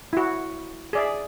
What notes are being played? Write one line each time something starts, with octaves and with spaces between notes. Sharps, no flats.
E4 F#4
G#4 D5 E5